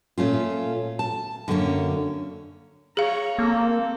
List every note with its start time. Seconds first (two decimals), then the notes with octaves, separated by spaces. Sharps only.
0.18 A#2 A3 C#4 F4
0.99 A5
1.48 F#2 D3 A#3 C4 C#4
2.97 G#4 C#5 F5 A#5
3.39 A#3 C4 A4